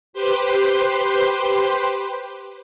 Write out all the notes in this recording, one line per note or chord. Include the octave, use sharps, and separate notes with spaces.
G4 B4 C5 C6